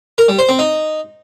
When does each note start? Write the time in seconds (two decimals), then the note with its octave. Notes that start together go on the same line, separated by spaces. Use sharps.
0.18 A#4
0.28 G3
0.39 C5
0.49 C4
0.59 D#4